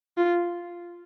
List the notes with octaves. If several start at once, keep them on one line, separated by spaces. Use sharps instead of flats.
F4